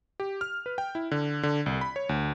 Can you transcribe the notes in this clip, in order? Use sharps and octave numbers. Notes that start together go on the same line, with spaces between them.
G4
F6
B4
G5
E4
D3
D3
C2
B5
C#5
D2